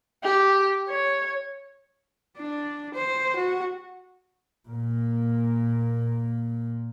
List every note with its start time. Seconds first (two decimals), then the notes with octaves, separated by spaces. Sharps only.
0.23 G4
0.89 C#5
2.37 D4
2.94 C5
3.36 F#4
4.69 A#2 A#3